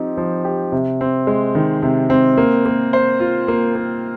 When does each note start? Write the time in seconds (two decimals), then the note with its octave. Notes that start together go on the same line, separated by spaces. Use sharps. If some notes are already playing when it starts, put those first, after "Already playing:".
Already playing: F3 C4 D#4 G4
0.17 F3
0.45 G4
0.72 C3
1.01 C4
1.27 G#3
1.55 D#3
1.83 C3
2.10 C4
2.37 A#3
2.66 A#3
2.93 C5
3.20 F4
3.48 A#3
3.75 A#3